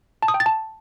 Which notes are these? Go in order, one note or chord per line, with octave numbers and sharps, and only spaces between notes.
A5
D#6
G5
A6
A5